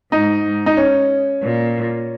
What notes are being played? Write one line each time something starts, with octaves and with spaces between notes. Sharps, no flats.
G#2 D#4
D#4
C#4
A#2